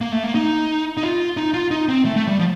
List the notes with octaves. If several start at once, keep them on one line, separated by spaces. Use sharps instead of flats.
A#3
A3
A#3
D#4
D#4
F4
D#4
F4
D#4
C4
A3
A3
G3
F3